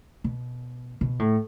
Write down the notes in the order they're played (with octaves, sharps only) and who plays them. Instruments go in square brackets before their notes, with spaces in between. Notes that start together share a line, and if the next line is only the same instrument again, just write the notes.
[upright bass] B2
B2
A2